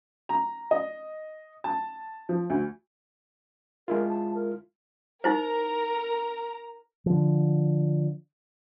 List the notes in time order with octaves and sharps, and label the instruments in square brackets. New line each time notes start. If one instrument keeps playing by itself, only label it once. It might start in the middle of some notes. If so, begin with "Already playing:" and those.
[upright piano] A#5
D#5
A5
F3
D2
[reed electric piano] G#3 E4 F4 [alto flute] A#4
[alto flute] A5
A#4
[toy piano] D#4 E4 C5 [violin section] A#4 A#5
[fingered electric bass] D3 F3